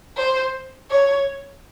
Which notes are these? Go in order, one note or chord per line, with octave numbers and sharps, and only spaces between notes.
C5
C#5